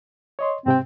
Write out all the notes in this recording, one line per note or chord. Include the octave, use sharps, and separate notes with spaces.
C#5 D#5 C6
G#2 C3 C4 G5